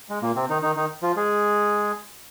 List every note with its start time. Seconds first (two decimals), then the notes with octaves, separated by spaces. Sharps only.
0.10 G#3
0.22 A#2 A#3
0.36 C3 C4
0.50 D#3 D#4
0.62 D#3 D#4
0.76 D#3 D#4
1.02 F3 F4
1.16 G#3 G#4